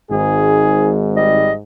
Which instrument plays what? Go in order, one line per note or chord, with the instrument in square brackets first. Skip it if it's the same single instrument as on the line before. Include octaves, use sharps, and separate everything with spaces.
[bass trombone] G#1 [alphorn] G#2 [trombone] G#4
[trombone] G3 [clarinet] D#5